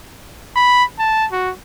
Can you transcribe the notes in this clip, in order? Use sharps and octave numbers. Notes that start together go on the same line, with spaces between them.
B5
A5
F#4